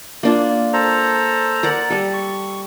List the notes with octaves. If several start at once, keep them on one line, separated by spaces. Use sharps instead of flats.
A#3 D4 F4
A4 C5 A#5
A#4 D5 F#5
G3 A4
C#6